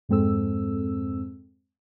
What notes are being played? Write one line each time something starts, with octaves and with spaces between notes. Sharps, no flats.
F2 G#2 G#3 C4 A4 E6